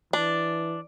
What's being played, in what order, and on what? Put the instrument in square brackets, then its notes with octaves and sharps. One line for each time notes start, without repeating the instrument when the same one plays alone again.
[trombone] E3 [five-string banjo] D4